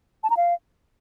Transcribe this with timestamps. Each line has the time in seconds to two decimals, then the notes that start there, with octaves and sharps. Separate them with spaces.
0.23 A5
0.30 A#5
0.37 F5